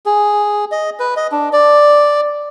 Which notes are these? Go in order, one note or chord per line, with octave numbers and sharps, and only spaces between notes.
G#4
D#5
B4
D#5
D4
D5